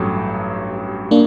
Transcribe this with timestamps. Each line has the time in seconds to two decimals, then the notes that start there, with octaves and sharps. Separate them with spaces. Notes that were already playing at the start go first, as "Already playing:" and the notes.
Already playing: A1 G2 F#3 A3
1.11 A#3 D4